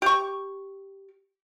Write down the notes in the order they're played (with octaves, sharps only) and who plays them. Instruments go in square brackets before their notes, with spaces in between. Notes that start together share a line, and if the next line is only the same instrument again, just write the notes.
[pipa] G4 C#6